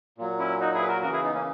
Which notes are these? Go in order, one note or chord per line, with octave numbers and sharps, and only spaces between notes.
A#2 F#3
C#4 E4
D#4 F#4
E4 G#4
B4
F#4 A#4
C#3 E3 F#4 A#4
E4 G#4
B3 D#4
A#3 C#4